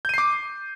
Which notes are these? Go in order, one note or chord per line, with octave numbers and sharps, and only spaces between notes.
D6 G6 C7 D#7